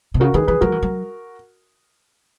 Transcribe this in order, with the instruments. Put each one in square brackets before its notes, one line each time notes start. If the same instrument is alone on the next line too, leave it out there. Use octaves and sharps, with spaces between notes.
[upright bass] B2
[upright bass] C#3 [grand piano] F#4 A#4
[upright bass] D#3 [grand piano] G#4 B4
[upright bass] E3 [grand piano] G#4 B4
[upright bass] F#3 [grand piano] F#4 A#4
[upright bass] E3
F#3